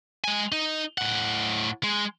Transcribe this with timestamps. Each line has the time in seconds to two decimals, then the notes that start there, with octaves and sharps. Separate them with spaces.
0.24 G#3 G#5
0.52 D#4
0.98 A2 F#5
1.83 G#3